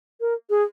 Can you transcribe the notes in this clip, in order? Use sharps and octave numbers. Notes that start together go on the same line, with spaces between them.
A#4
G#4